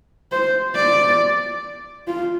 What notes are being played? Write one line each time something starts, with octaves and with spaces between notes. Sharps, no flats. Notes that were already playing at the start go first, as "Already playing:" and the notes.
C5
D5
F4